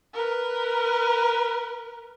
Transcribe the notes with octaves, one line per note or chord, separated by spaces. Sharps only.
A#4 B4